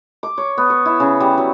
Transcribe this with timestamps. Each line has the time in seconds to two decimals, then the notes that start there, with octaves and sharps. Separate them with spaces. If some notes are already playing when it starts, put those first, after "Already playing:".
0.23 D6
0.38 C#5
0.58 B3
0.70 C#5
0.86 E4
1.00 C#3
1.20 G3
1.38 F#3